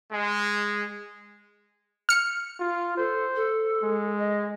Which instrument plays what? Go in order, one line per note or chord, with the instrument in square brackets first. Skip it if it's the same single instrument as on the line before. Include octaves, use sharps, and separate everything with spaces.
[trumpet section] G#3
[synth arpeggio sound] F6 C#7
[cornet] F4
[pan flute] A4 [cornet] C5
[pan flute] A4
[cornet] G#3
[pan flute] D#5